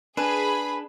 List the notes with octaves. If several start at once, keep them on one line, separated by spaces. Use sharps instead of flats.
D4 G#4 B4 G#5 B5